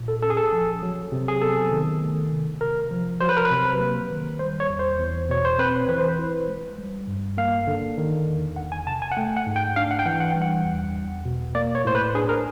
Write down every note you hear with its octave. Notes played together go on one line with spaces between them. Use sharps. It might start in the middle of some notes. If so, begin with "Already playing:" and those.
Already playing: A#2
A4
C#4 A4
G#4
A4
F3
F#3
C3
G#4
B3 A4
D#3
A3
C3
C3 A#4
F3
F#3 C5
B4
A#4
B4
C3
A#3
D#3
G3 C5
C#5
E2
C5
E2
B2 C#5
C5
C4 B4
E3 B4
C5
B4
E4
G#3
G3
G2
A#3 F5
D3
D#3
E2
E2 F#5
G#5
C3 A5
G#5
F#5
A3 G5
F#5
G#2
G5
D4 F5
F#5
G5
E3 F#5
F#5
G3 G5
F#5
E2
E2
B2
A#3 D5
C#5
A2 C5
B4
D4 G#4
A#4